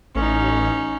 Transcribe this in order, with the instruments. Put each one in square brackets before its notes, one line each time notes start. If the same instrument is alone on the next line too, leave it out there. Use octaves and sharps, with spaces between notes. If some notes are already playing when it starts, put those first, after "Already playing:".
[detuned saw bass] A1 [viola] C#4 D#4